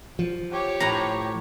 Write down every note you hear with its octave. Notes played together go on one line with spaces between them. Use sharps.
F3
G4 C#5
A2 A#5